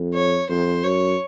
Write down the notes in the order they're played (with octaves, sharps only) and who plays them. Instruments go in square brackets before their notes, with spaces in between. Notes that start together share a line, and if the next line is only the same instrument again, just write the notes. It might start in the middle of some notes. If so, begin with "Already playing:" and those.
Already playing: [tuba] F2
[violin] C#5
[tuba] F2 [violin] C5
[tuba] F#2 [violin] C#5